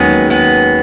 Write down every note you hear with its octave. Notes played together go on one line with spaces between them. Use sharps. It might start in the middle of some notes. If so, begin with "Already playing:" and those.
Already playing: D#2 D#3 F#3 G#3 B3 C#4 G#4
G#3 B3